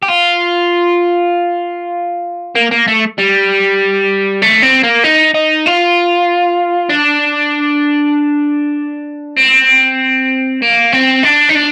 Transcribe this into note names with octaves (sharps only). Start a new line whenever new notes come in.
G4
F4
A#3
A#3
A3
G3
A3
C4
A#3
D#4
D#4
F4
D4
C4
A#3
C4
D4
D#4
D4